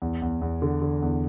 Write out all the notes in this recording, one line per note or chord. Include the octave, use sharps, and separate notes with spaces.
E2
E2
E2
D3
D3
E2